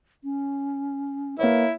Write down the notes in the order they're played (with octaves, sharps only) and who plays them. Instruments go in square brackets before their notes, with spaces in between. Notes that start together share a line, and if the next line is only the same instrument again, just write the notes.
[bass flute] C#4
[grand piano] A#3 C#5 [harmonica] E4 [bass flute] B4